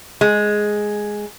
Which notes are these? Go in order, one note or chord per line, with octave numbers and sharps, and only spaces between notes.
G#3